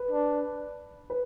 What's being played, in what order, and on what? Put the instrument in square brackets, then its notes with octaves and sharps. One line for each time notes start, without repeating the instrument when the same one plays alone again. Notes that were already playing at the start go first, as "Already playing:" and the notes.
Already playing: [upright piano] B4
[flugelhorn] D4
[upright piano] B4